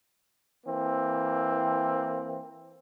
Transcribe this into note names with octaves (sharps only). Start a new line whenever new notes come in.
E3 A#3 C4